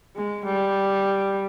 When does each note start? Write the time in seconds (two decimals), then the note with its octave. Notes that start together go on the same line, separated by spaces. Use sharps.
0.16 G#3
0.45 G3